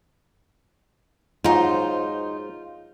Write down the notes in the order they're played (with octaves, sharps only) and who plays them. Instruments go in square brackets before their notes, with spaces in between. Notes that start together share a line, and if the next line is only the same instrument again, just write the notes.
[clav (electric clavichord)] G#2 F#3 [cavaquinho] D#4 C5 [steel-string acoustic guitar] F4